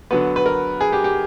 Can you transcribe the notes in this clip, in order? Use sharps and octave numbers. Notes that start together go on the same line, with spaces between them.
D3 F#3 B3 B4
B4
A#4
G#4
G4
G4